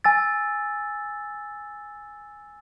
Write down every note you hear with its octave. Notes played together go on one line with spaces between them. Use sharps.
G#5 E6 A6